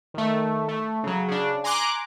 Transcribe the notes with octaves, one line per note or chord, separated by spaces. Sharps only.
D#3 A3
A3
C#3 F#3
C#3 D4
G#5 A#5 C6 D6 F#6